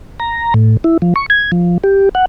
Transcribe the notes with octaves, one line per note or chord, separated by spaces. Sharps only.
A#5
A2
E4
F3
C#6
G#6
F3
G4
F#5